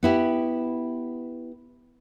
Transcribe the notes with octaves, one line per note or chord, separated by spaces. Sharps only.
B3 E4 G4